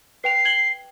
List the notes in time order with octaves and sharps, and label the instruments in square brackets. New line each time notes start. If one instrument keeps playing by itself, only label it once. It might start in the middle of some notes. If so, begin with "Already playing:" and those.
[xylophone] B4 G5 F7 [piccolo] C7
[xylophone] G#6 F#7 G7